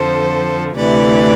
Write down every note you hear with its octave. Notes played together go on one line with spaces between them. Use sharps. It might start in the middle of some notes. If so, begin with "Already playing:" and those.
Already playing: F2 D3 F3 A4 C5
D2 C3 E3 B4 D5